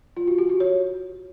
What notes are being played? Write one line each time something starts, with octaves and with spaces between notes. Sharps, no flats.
F4
F#4
G4
F#4
C#5